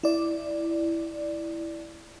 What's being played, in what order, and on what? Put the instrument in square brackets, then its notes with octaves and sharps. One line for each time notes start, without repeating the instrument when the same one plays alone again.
[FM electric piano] E4 D5